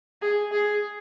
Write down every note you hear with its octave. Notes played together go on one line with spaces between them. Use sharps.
G#4
G#4